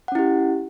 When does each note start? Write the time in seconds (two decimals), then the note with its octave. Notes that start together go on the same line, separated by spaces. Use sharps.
0.08 F#5
0.12 C#4
0.15 E4
0.19 G4